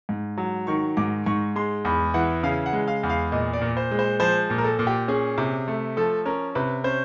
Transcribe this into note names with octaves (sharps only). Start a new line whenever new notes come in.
G#2
F#3
D#3 C#6
G#2 D6
G#2 C#6
G#3 C6
E2 B5
E3 F#5
C#3 F5
F#5
G#3
F5
E2
F5
A#2 D#5
D5
A#2
C5
G#3
C5
F3 C5
A#2
A#4
A4
A#2
G4
C#4 G#4
C3
A3
F3 A4
C#4 A#4
C3 B4
C#4 C5